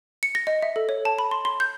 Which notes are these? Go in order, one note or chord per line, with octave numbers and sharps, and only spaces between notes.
C#7
A#6
D#5
E5
A4
C#5
A5
B5
C6
C6
G6